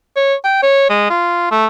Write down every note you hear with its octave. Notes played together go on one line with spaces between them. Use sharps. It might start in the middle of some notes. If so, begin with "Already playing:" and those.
C#5
G5
C#5
G#3
F4
A3